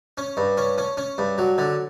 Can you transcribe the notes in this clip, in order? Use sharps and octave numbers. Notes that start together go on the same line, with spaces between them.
C#4
G2
C#4
C#4
C#4
G2
F#3
D3